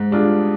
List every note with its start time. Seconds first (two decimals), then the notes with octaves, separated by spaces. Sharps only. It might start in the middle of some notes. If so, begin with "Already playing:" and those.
Already playing: G#2
0.11 G3 D4 F4 G#4